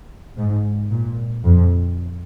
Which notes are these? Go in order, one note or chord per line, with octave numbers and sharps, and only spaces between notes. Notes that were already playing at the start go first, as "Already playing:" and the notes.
G#2
A#2
F2